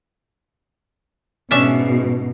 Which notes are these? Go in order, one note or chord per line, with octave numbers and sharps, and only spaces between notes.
G#2 B2 C#4 D4 E5